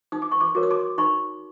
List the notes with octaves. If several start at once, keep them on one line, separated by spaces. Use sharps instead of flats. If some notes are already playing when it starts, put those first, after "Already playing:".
D#4 D#6
D6
C#6
C6 D6
F#4 A#4 C#5 D6
D#6
C6 D6
D#4 B5 C#6